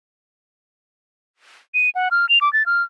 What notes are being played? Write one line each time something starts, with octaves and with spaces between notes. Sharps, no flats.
D#7
F#5
F6
F7
D6
A6
F6